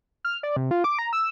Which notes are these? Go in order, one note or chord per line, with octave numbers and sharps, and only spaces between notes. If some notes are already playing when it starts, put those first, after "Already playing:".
F6
D5
C3
F4
D6
A#5
E6